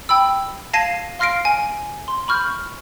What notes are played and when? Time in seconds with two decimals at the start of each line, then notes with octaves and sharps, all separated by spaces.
0.09 G5 B5 E6
0.73 F5 A5 G#6 A#6 C7 D#7
1.19 F5 C6 F6 A#6 C7 D7
1.45 G#5
2.08 C6
2.28 B5 C#6 F6 G6